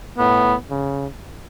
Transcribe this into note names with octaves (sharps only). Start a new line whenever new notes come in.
A2 B3
C#3